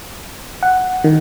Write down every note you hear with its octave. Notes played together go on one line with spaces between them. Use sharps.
F#5
D#3